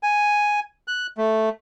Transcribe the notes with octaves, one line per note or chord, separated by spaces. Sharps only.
G#5
F#6
A3